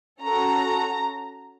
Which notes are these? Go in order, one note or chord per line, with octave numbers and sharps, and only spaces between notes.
C#4 F#4 A4 A#5